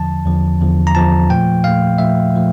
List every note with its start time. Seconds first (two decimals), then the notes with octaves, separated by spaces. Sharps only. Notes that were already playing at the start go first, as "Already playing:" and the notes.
Already playing: E2 D3 F3 A5
0.25 E2 D3 F3
0.61 E2 D3 F3
0.87 A#5
0.95 E2 D3 F3 A5
1.30 A#2 F3 A3 G5
1.64 A#2 F3 A3 F5
1.98 A#2 F3 A3 E5
2.34 A#2 F3 A3